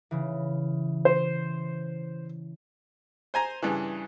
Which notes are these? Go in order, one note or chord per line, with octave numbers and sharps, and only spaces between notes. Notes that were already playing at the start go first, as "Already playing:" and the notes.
C#3 E3
C5
C5 G#5 A#5
G2 C#3 E3